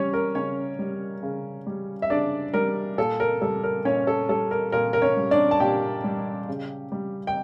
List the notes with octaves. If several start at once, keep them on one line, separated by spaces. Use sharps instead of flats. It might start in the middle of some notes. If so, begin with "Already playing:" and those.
Already playing: G3 C#4 C#5
A#4
C#3 C#4 C#5
G3
C#3
G3
E5
C#3 D4 D5
G3 A#4
A#2 A4
A#4
G3 A4
A#4
A#2 C#4 C#5
A4
G3 A4
A#4
A#2 A#4
A#4
C#4 C#5
G3
D4 D5
A5
A#2 G4 G5
G3
C#3
G3
G5